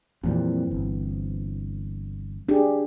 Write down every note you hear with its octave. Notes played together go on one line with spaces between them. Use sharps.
F2 A#2 E3 G3 C4
G1
D4 G4 G#4